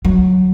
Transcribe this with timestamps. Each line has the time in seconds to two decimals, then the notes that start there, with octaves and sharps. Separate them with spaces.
0.05 F#3